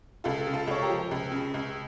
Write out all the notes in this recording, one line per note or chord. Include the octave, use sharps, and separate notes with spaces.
C#2 F4 A4
C#3
F4 A4
C#2 C#5
G4 A#4
F3
C#2
C#3
C#2